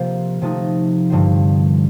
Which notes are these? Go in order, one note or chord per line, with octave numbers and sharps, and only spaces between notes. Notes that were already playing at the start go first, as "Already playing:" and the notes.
Already playing: C3 F3 A#3 F4 C5
C3 F3 A3 D#4
G2 D3 F3 C4